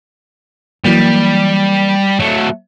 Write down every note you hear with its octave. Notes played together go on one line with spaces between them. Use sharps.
E3 F#3 G3 A#3
F#3 A3